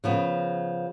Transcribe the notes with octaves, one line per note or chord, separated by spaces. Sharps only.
C#3 F3 B3